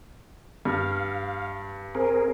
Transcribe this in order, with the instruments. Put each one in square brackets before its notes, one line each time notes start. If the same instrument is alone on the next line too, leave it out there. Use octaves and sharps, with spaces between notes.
[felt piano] G2 [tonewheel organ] F5
[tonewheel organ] C4 G#4 A#4